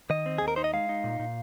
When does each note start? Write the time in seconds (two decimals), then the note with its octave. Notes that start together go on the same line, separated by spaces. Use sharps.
0.10 D#3 D#5
0.26 C4
0.38 D#2 G#4
0.48 A#4
0.56 D#4 C5
0.64 D#5
0.73 G#3 F5
0.89 D#4
1.04 A#2
1.20 A#2